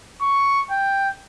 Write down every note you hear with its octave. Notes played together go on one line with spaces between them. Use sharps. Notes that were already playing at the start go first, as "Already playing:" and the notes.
C#6
G5